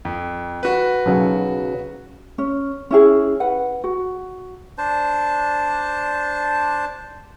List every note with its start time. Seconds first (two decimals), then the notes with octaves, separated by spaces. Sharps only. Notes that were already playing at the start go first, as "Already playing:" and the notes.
0.05 F2
0.63 F#4 B4
1.06 B1 C#3 F#3
2.38 C#4
2.91 C#4 E4 G#4
3.40 B4 F#5
3.84 F#4
4.78 D4 C5 A5